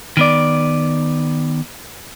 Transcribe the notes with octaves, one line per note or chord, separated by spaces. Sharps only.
D#3 B3 D5